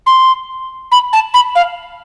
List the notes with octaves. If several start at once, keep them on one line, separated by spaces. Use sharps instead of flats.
C6
B5
A5
B5
F5